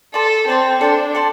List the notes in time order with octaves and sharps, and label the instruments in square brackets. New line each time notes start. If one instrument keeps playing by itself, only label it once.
[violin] A4 [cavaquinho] D5 A5 C6
[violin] C4 [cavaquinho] D5 A5 C6
[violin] D4 [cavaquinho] A4 D5 G5 C6
[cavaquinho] A4 D5 G5 C6